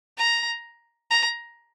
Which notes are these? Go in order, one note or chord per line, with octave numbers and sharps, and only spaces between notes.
A#5
A#5